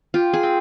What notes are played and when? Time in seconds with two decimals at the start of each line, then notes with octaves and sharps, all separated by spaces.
0.14 F4 G4
0.33 G#4
0.43 C4